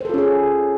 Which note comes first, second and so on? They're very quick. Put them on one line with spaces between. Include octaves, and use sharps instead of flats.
C5 A4 F4 C#4 G#4